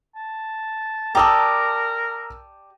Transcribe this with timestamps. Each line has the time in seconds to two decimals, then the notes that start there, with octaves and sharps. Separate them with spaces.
0.16 A5
1.15 G4 A#4 D5 A5 A#5 D#6 E6